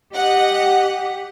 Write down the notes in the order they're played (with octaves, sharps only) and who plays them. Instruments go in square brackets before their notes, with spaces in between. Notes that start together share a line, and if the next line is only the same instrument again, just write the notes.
[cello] G4 [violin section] D#5 F#5